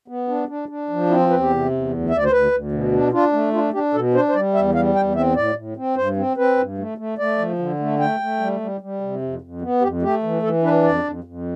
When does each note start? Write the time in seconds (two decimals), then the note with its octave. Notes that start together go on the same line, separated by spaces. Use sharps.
0.08 B3
0.28 D4
0.48 D4
0.69 D4
0.89 F3
1.10 C4 E4
1.20 F4
1.30 E2 B4
1.40 G4
1.50 C3
1.71 E2
1.90 D2
2.09 D2 E5
2.17 D5
2.24 C5
2.31 D2 B4
2.52 D2
2.72 B2
2.92 D4
3.12 D4 F4
3.33 A3
3.53 D4 F4
3.73 D4 G4
3.94 B2 A4
4.13 D4 C5
4.29 C5
4.34 G3 D5
4.54 E2 E5
4.75 G3 F5
4.95 E2 G5
5.15 C4 E5
5.36 A2 D5
5.55 A2
5.77 C4
5.96 G2 C5
6.17 C4
6.37 C4 B4
6.57 G2
6.78 A3
6.98 A3
7.18 A3 D5
7.38 F3
7.59 D3
7.79 A3
7.99 A3 G5
8.20 A3
8.40 G3
8.60 G3
8.81 G3
9.01 C3
9.21 F2
9.42 F2
9.62 B3
9.82 F2 G4
10.02 A3 G4
10.23 E3
10.43 E3 A4
10.63 D4 B4
10.84 F2 D5
11.04 F2
11.24 F2